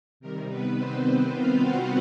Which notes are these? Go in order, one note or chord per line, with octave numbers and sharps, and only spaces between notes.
C3 D#3 G3 A#4
B3 B4
C4 C5
F4 F5
F#4 F#5